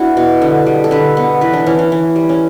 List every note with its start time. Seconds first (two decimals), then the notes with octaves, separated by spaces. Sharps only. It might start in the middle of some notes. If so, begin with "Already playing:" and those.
Already playing: B3 D4 E4 F#4
0.17 B2
0.42 D3
0.67 G3
0.84 A4
0.91 D3 B4
1.17 B3
1.41 E3 B4
1.53 D4
1.66 E3 C#4
1.79 C#4
1.92 E3
2.16 G3
2.29 C#4